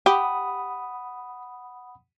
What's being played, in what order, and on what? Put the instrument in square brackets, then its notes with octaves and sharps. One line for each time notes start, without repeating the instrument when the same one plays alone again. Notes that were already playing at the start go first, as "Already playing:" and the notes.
[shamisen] G4 [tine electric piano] F#5 B5 D#6